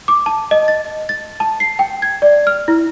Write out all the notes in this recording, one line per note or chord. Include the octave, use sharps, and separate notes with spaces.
D6
A5
D#5
A6
A6
A5
C7
G5
G#6
D5
F6
E4